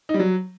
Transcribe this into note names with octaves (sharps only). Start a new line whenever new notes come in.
D#4
G3
F#3